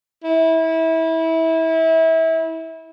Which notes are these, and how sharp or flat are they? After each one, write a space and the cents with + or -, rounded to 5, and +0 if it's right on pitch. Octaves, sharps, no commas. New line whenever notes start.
E4 -25